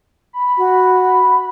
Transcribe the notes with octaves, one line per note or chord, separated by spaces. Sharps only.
B5
F#4